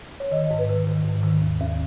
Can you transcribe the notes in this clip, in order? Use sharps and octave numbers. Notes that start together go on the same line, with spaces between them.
C#5
D#3 D#5
G#2
B4
D#3
D#3
G#2
D#3
D#2
D#2